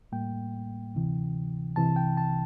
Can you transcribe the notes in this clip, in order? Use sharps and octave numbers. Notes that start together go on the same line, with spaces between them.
A2 G3 A#3 G5
D2 C3 E3
C2 C3 E3 A5
G5
A5